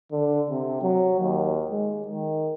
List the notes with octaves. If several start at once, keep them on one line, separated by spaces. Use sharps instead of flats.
D3
C3
F#3
D#2
G#3
D#3